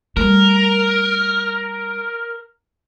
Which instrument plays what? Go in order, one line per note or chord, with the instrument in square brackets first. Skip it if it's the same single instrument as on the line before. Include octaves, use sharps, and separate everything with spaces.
[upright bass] G3 A3 [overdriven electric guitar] A#4